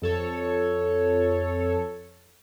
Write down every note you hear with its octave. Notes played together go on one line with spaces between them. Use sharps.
F2 A4 C#5